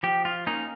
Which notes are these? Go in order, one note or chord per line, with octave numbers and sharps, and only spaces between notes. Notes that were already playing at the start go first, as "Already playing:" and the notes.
F3 G4
F4
A#3 C#4 D#4